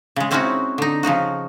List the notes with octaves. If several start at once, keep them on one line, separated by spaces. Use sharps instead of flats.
C#3 G#3
G#3 C4 C#4 D#4 E4 F#4
D3 D#4
C#3 F3 D#4 F#4